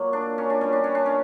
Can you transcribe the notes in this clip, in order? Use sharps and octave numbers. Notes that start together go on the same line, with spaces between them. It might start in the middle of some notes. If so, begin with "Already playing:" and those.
Already playing: A#2 F#3 A#3
D4
C#4
D4
A#2 G3 B3 C#4
D4
C#4
D4
C#4